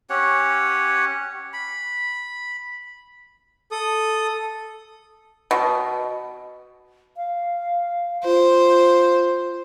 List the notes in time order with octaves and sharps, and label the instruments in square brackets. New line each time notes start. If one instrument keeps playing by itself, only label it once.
[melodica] C#4 G4 C#5 F#5
B5
[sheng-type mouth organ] A4 D#6
[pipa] B2
[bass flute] F5
[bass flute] F4 [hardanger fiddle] C5